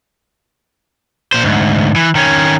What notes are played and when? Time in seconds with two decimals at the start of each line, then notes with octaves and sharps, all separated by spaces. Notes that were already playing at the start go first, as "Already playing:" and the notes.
1.32 A#2 C5
1.44 D2 G#2
1.96 E3
2.15 D#3 C#4